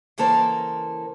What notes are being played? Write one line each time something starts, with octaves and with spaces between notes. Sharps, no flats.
C#3 E3 A#3 A4 A#4 C5